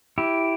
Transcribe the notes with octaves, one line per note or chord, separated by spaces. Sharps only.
E4 G4